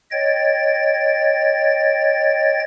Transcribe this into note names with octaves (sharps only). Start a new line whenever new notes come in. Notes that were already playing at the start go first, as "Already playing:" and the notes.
C#5 D#5 G5 A6